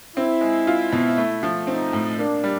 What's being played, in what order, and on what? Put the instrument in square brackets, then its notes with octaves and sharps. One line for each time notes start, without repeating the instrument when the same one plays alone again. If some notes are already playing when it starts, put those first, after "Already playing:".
[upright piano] C4 [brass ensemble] E4
[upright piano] G#3
F4
B2
A3
F3
[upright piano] C4 [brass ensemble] D#4
[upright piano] A2
[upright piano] A#3 [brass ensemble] D4
[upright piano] G3